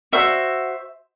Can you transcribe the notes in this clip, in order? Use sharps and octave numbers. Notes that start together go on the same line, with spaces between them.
F#4 C5 E5